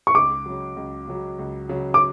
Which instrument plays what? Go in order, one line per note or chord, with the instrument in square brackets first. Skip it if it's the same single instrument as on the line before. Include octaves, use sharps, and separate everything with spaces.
[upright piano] C#6
[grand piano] C#2 [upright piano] D6
[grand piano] C#3 F#3
C#2
C#3 F#3
C#2
C#3 F#3
[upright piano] D6